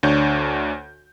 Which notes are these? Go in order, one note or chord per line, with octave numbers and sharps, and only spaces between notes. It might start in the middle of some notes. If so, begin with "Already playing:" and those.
D2 D4 C#5 G6